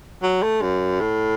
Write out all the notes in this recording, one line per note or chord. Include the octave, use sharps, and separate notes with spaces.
F#3
A3
F#2
A2